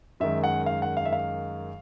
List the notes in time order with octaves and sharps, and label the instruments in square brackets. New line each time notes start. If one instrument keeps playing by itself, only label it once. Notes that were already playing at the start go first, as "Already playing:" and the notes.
[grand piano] F#2 D#3 G#3 E5
F#5
F5
F#5
F5
E5
F5